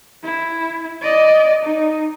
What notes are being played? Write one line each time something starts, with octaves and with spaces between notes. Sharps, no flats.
E4
D5 D#5
D#4